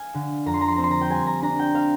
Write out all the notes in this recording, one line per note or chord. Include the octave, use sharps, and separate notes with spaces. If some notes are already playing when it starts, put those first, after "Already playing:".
Already playing: F5 G#5
D3
F2 A#5
C6
A#5
C6
C4 A#5
C6
A#5
G5
G3 G#5
A#5
D4 A#5
G5
C4 F5